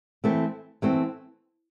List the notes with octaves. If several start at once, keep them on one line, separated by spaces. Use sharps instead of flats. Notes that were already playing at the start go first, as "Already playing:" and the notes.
E3 A3 C4
E3 A3 C4